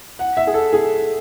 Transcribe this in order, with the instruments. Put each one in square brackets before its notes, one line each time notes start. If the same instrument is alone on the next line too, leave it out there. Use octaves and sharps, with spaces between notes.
[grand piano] F#5
E5
G#4
A4
G#4